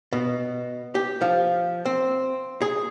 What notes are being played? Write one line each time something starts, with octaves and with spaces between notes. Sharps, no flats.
B2
G4
F3
C4
G#4